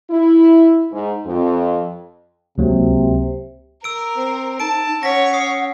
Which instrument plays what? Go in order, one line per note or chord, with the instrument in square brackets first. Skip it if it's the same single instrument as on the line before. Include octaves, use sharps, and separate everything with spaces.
[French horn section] E4
G#2
F2
[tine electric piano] C#2 F#3 A#3 [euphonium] C3
[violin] A#4 [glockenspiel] E6 D7
[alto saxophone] C4
[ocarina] D#4 [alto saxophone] A5 [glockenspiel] D7
[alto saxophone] C#4 [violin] C#5 [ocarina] F#5 [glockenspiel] A#6 B6
[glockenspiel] D#6 C7